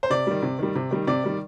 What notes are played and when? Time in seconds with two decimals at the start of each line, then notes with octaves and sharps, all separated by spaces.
0.03 C5
0.10 C3 D5
0.27 D#3 G3
0.43 C3
0.59 D#3 G3
0.75 C3
0.91 D#3 G3
1.07 C3 D5
1.24 D#3 G3